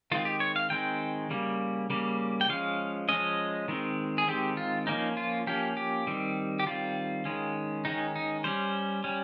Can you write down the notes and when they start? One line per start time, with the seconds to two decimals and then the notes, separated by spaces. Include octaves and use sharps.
0.11 D#3 G#3 C4 F4
0.25 G4
0.40 C#5
0.56 F5
0.70 D#3 G#3 C4 G5
1.30 C#3 G3 A#3
1.90 C#3 G3 A#3
2.41 G5
2.49 F3 G#3 C#4 F5
3.09 F3 G#3 C#4 D#5
3.68 D#3 G#3 C4
4.18 G#4
4.28 D#3 G#3 C4 G4
4.57 F4
4.87 F3 A#3 C#4 D#4
5.17 F4
5.47 F3 A#3 C#4 G4
5.77 G4
6.07 D#3 G3 C4
6.59 G4
6.66 D#3 G3 C4 F4
7.25 D#3 G#3 C#4
7.85 D#3 G#3 C#4 D#4
8.16 D#4
8.44 G3 C#4 C5
9.04 G3 C#4